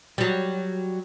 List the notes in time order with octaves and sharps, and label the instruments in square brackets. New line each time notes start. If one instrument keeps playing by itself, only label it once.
[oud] F#3 G3